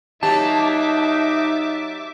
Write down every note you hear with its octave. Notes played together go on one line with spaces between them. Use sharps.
F#3 A#3 D#4 G4 E5 A5 D6